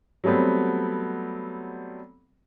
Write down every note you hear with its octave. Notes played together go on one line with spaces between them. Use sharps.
F#3 G3 A3 B3 C4